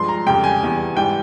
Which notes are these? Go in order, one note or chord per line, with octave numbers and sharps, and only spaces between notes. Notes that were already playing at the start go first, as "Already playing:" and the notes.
Already playing: G2 F3 G#3 C6
A#5
F2 C#3 G3 G5
G#5
E2 E3 G3
G#2 E3 G3 G5